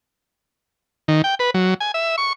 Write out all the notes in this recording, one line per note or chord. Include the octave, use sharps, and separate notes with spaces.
D#3
G5
B4
F#3
G#5
E5
C#6